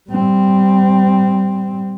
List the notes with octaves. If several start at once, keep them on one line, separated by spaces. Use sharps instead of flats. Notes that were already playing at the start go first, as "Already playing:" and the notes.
G3 C4